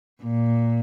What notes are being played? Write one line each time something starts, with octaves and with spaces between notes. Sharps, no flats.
A#2